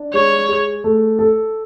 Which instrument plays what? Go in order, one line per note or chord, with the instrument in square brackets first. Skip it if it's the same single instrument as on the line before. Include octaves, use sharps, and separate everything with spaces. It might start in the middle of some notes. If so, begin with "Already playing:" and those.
Already playing: [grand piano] D4
[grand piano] G#3 [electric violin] C#5
[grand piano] G#4
A3
A4